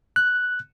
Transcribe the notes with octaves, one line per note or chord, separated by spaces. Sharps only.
F#6